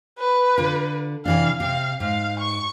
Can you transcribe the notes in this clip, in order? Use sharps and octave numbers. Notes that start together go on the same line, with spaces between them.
B4
D3 F4
C3 E3 D4 F5
C3 F5
G#2 F5
C#6